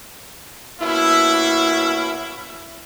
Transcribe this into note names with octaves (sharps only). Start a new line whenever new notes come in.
B2 A#3 C#4 E4